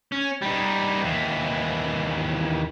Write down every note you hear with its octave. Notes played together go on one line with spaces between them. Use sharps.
C#4
G3 D#4
D#2 E3